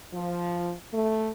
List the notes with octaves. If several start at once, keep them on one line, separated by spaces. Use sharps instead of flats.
F3
A3